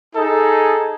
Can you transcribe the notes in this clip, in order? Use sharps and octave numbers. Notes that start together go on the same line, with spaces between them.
D#4 G#4 A4